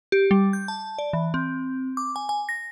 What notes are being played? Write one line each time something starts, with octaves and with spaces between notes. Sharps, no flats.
G4
G3
G6
A5
D5
E3
C4
D6
G#5
G#5
A#6